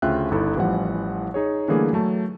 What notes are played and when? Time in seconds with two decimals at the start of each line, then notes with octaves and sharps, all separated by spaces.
0.02 D2 C#3 F4 E5 G5 F#6
0.31 G1 D#4 E4 A4
0.56 A1 E3 F3 G3 F#5
1.34 D#4 G#4 C#5
1.68 D3 E3 G3 A3 A#3 G#4
1.93 F#3 A3 A5